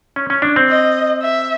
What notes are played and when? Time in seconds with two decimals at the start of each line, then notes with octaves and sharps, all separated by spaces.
0.16 C#4
0.30 C#4
0.42 D4
0.56 C4
0.69 D#5
1.22 E5